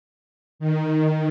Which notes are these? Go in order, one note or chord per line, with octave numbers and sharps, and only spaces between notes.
D#3